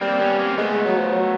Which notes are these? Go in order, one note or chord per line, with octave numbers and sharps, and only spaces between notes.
G3 A#3 C4
B3 C#4
A#3 C4
G#3 A3 B3
F#3
F3
F#3